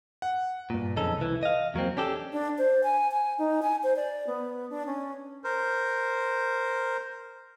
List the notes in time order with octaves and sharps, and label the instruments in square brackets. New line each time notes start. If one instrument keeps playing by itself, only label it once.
[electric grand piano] F#5
[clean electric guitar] G2 A#2
B1 F2 C#3 C#4 D#4 A4
C2 E3
D#5 F5
E2 F#3 A#3 C4
C#4 D4 G4 A4
[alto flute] D4
C5
G#5
G#5
D#4
G#5
C5
D5
B3
D4
C#4
[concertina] A#4 C5